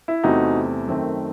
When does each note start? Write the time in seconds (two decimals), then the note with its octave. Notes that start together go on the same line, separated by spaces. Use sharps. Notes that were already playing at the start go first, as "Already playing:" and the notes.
0.08 E4
0.23 E2 C3 E3 A3 C4 D#4 F#4
0.87 F#2 D#3 A3 C4